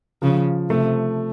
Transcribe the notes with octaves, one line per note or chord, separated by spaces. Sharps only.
C#3 F3
C3 A3